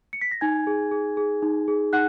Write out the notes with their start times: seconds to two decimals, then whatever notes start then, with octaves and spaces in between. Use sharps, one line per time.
0.13 C#7
0.21 B6
0.31 A#6
0.41 D#4 G#5 G#6
0.67 G#4
0.91 G#4
1.17 G#4
1.43 D#4
1.68 G#4
1.93 D#4 F#5 F#6